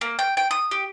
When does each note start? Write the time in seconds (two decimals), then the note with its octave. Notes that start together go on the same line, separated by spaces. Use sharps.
0.01 A#3
0.19 G5
0.37 G5
0.51 D#6
0.71 G4